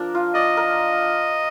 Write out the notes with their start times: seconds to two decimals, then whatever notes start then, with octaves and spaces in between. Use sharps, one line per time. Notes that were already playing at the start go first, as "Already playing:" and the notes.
Already playing: F3 D4 A#4
0.15 F4
0.35 D5 D#5
0.57 A#4